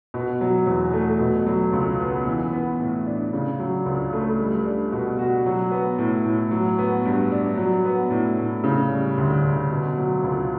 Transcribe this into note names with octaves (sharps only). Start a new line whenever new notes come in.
B2
F#3
E2
A3
B2
F#3
C#2
B3
E3
B3
A2
D4
C#3
F#3
C#2
A3
G3
D4
B2
F#4
F#3
B3
A2
A2
F#3
B3
G2
D4
F#3
B3
A2
A2
C#3
G3
D2
D2
B2
F#3
C#2